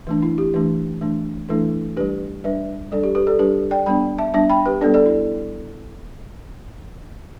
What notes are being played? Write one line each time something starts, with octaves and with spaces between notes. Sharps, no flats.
E3 A3 D4
E4
G4
E3 A3 D4
E3 A3 D4
E3 A3 D4 E4 A4
G3 D4 G4 B4
G3 D4 B4 E5
G3 D4 A4 D5
G4
G4 B4
A4 D5
G3 D4 G4 B4
D5 G5
G3 B3 D4 G5 B5
E5 A5
G3 B3 D4 E5 A5
G5 B5
G4 B4
G3 B3 D4 A4 D5
A4 D5
E4